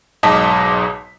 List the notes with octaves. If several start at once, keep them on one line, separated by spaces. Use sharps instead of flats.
B1 G#2 D#5 A5 D6 B6